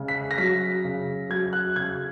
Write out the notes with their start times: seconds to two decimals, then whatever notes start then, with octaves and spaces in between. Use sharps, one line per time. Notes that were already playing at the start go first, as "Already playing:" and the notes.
Already playing: C#3 G#3
0.08 B6
0.31 A#6
0.38 F#3 B6
0.85 C#3
1.30 F#3 G#6
1.53 F#6
1.76 C#3 G#6